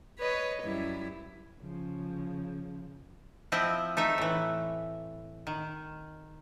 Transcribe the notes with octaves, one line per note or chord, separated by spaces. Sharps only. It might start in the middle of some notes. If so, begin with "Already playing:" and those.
B4 C#5 D#5
F#2 G3 E4
C#3 F3
F3 C4 E4 D#5 G5
A3 D#4 E5
A2 E3
D#3